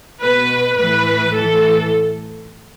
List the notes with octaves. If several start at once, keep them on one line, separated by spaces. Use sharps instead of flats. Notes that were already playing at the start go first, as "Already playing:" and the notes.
B2 B4
A2 E3 B4
A2 E3 A4